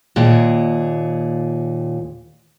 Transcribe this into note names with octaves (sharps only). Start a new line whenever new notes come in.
D#2 A#2 G#4